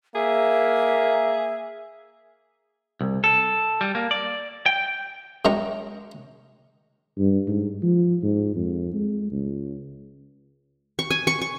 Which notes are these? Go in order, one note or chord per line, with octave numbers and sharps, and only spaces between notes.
A#3 G#4 E5
C2
A4
G3
A#3
D5
G5
F#2 G#3 G5 A#5 C#6
G2
G#2
F3
G#2
F2
G#3
C#2
C#6
G#5
C#6
C#6